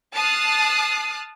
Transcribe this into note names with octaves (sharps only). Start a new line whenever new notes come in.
A5 D#6 F6 F#6 A6 C7